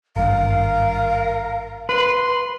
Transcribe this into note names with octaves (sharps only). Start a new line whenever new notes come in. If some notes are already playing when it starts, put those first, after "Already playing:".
G#1 G2 A#4 F5
B4 C6